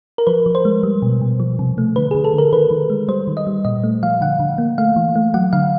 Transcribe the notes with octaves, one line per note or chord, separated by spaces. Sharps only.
A#4
F3 B4
F3
C5
G#3
G3
B2
B2
F3
C3
A3
D3 B4
D3 G#4
A4
D3 A#4
D#3 B4
D#3
G#3
G3 C5
D#3
D#5
G3
A#2 D#5
A3
F3 F5
D3 F#5
D3
A#3
A3 F5
E3
A3
F#3 F#5
D3 F5